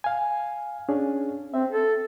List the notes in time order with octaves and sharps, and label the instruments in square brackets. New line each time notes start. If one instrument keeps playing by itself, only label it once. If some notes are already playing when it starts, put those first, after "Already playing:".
[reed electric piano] F5 G#5
C#4 D4 G#4
[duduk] C4 [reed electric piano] E5
[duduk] A4